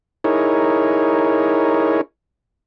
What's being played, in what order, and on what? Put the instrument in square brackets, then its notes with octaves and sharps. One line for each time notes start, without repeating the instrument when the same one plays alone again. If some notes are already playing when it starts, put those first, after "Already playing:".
[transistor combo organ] D#4 E4 G#4 A#4 C#5